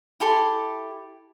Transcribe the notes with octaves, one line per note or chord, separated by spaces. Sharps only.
E4 G4 A4 C6